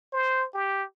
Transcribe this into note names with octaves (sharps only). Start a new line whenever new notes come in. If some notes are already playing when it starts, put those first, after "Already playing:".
C5
G4